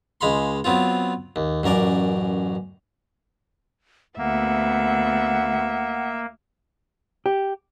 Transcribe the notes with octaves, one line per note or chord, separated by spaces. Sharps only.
C#2 G#3 F5 B5 C6
F#3 B3 C4 F4
D#2
A1 F#2 A#4 D5 D6
D2 A#3 B3 E5 F#5
G4